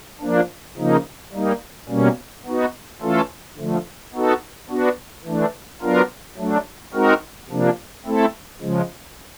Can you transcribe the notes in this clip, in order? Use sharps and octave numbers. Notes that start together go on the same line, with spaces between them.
F3 A#3 D4
C#3 F3 A#3 D#4
G3 A#3 D#4
B2 G3 A#3 C#4
B3 D#4 F#4
E3 A3 C#4 F4 A4
D3 F3 A3
B3 D#4 F#4 A4
B3 D4 F#4
E3 A3 D4
F#3 B3 D4 F4 A#4
F#3 A3 D4
G#3 C4 D#4 F#4 A#4
C3 F3 A#3 D4
A3 C4 E4 A4
C#3 F3 G#3